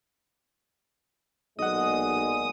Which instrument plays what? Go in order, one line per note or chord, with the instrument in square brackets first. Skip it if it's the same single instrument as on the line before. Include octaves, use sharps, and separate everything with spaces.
[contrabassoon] B1 [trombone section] A#2 G#3 [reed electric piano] D#5 F#5 [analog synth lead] D#6